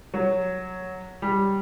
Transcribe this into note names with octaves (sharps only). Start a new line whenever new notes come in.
F#3
G3